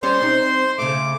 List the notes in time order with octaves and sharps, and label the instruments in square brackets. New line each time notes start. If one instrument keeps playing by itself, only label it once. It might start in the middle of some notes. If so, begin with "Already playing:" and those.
[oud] G3 C4 C#4 [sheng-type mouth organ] C5 C6
[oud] C4 D#4
[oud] C#3 A3 [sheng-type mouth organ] D6